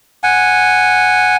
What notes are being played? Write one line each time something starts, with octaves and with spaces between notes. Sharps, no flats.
F#5 G#5